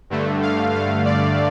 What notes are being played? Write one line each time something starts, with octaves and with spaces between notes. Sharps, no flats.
G2 D3 A3
F5
F5
D5